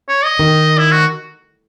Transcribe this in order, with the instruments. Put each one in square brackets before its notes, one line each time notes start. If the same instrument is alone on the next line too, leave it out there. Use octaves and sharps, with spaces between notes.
[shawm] C#5
D#5
[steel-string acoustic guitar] D#3
[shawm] E4
F#4